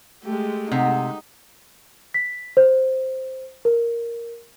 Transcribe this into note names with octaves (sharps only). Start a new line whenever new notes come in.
G#3 A3 G4
C3 D#4 F#5
B6
C5
A#4